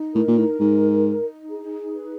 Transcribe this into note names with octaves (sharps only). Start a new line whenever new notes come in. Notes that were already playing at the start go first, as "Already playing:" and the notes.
Already playing: D#4
A2 A#4
A#2
A2
G#2 D#4
D#4
G#4
B4